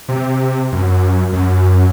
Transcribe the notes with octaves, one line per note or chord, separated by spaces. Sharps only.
C3
F#2
F#2